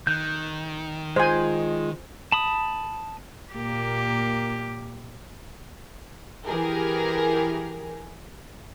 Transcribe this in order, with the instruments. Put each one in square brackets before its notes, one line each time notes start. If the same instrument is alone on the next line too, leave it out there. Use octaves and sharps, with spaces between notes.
[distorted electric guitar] D#3 [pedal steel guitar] F#6 G6
[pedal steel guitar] G#3 F4 [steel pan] C5 G#5
[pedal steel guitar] A5 B5 D#6
[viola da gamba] A#2 A#3 G4
[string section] E3 G4 G#4 A#4